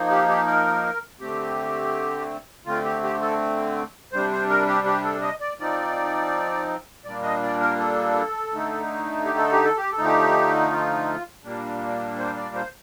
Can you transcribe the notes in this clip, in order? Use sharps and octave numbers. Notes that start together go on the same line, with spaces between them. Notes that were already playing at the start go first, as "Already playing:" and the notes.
Already playing: F3 A#3 D#4
G4
G4
A#4
D3 A3 C4 G4
D3 A3 C4 F4
G4
G4
A4
C3 G3 D4 C5
C5
A#4
G4
G4
A4
D#5
D5
F3 C4 D#4 D5
A#2 G3 A#3 D4 D5
D#5
D5
A#4
A4
D3 A3 D#4
G4
A4
G4
A4
G4
A4
D3 F3 A3 D#4
G4
F4
A#2 G3 A#3 D4
C5
D5
C5